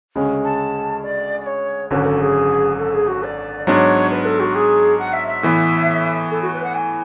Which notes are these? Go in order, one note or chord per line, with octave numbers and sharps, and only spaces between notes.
D2 C#3 G#3 C#4
A5
D5
D5
C#5
G#1 F#2 D3 F#3 C#4 B4
A4
G#4
A4
G#4
F#4
D5
G#2 F#3 B3 D4 C#5
B4
A4
F#4
G#4
F#5
E5
E5
A2 E3 B3
A4
F#4
B4
F#5
G#5